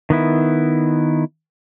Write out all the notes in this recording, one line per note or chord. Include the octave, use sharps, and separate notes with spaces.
D#3 B3 E4